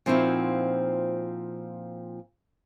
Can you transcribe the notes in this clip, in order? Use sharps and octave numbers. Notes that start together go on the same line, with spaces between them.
A#2 F3 C4 D#4 E4 F#4